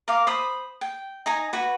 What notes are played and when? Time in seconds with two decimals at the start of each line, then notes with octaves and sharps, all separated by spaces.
0.08 A#4 F5 D6
0.27 C5 B5 D#6
0.81 G5
1.26 D#4 G#5 A#5
1.53 F#4 B4